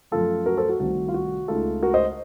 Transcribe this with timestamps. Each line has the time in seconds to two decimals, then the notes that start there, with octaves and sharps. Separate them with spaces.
0.12 F#2 F3 A3 F4 A4
0.46 F#4 A#4
0.57 A4 C5
0.69 F#4
0.80 C2 C3 D#3 A3 F#4
1.08 F4
1.14 F#4
1.48 C#2 C#3 A3 D#4 F4 A4
1.82 F#4 A#4
1.94 C5 D#5